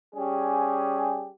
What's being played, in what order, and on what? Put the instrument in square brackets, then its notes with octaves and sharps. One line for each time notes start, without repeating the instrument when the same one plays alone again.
[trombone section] G3 C#4 G4 G#4